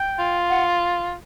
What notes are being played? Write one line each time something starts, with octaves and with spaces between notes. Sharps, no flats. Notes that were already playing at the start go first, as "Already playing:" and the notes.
Already playing: G5
F4
F#5